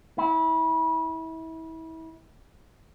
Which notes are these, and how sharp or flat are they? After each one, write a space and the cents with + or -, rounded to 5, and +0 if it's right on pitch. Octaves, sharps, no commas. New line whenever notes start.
E4 -30